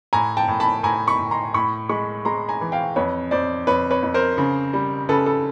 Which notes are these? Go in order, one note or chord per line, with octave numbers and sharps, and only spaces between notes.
A2 G#5 A#5
G5 A5
A2
A5 B5
A2 G#5 A#5
B5 C#6
A2
A#5 C6
A2 B5 C#6
G#3 B5 C#6
G#3 A#5 C6
G#5 A#5
E3
F5 G5
F2 B4 C#5
F2 C5 D5
F2 B4 C#5
B4 C#5
F2
A#4 C5
C#3
G3
C#3 A4 B4
A4